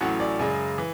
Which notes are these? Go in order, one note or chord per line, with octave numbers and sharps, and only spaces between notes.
A1 A2 F#3 C#4 F#5
D5
F#2 C#3 G#3
E3